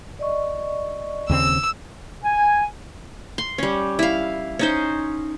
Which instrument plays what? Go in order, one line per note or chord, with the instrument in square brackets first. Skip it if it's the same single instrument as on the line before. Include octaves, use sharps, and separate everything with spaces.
[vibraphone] D5 D#5 C#6
[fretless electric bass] D#2 C#3 C4 [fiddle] E6
[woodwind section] G#5
[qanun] C6
G3 C#4
E4 F5
C#4 D#4 C5